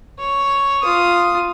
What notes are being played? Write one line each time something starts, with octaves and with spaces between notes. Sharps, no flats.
C#5
F4 D#6